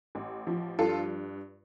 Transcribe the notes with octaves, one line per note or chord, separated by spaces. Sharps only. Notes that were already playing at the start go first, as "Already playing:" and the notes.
A1
F3
G2 F4 A4